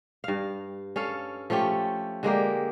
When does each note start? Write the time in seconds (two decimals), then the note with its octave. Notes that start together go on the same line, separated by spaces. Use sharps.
0.24 G2 F5
0.96 C#4 A4 F5
1.50 F3 A3 C#4 G4
2.23 D3 G#3 A#3 G4